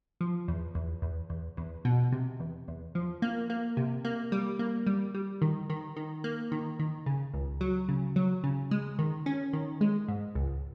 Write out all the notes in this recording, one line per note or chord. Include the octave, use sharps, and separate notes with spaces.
F3
E2
E2
E2
E2
E2
B2
C3
E2
E2
F3
A#3
A#3
C3
A#3
G3
A#3
G3
G3
D#3
D#3
D#3
A#3
D#3
D#3
C#3
C#2
F#3
C#3
F#3
C#3
G#3
D#3
C#4
D#3
G#3
G#2
C#2